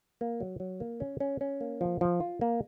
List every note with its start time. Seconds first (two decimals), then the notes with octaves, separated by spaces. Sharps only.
0.21 A#3
0.40 F#3
0.60 F#3
0.80 A#3
1.00 C#4
1.20 C#4
1.41 C#4
1.61 A#3
1.81 F3
2.01 F3
2.20 F4
2.41 A#3